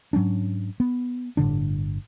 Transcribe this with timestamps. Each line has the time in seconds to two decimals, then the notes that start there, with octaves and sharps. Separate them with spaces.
0.13 G#2 F#3 C#4 D4
0.80 B3
1.37 G1 A2 D3 D4